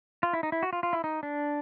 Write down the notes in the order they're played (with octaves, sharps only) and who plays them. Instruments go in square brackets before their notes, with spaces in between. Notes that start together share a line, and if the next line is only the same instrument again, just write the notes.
[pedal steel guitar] F4
E4
D#4
E4
F#4
F4
F4
E4
D#4
D4